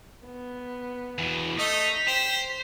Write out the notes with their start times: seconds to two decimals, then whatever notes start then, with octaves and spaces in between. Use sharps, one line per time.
0.26 B3
1.18 E2 B2
1.59 A3 D#4 D#5 B6 F7
2.08 C5 G5